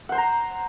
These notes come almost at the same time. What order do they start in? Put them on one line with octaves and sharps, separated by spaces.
F#5 C5 C6 A#5